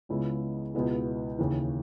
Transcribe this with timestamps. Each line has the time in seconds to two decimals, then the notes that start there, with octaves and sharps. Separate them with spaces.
0.09 C#2 C#3 G#3 B3 E4
0.74 C#2 B2 G#3 B3 E4
1.39 D#2 C#3 E3